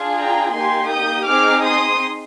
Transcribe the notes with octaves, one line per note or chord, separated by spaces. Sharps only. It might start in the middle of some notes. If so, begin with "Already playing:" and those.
Already playing: D4 F4 G#4
G5 A#5
A#3 D#4 G4 G#5 C6
D#6 G6
C4 D#4 G#4 D6 F6
C6 D#6